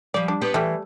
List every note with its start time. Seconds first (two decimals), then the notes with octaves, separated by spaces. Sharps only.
0.14 F3 G3 D5
0.28 D4
0.41 B3 G4 C5
0.54 E3 G3 A3